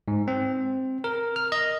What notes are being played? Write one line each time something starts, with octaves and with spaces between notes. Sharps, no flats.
G#2
C4
A#4
F6
D#5